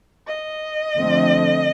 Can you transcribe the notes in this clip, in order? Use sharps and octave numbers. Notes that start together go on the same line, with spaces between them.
D#5
D3 F3 A3 C4